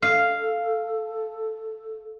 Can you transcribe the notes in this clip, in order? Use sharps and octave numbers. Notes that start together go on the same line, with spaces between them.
A4 F5